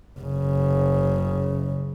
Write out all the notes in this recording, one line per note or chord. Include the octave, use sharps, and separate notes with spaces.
F#1 C#3